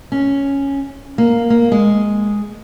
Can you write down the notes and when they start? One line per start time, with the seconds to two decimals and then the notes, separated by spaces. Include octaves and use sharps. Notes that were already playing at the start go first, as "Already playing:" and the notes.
0.12 C#4
1.18 A#3
1.50 A#3
1.72 G#3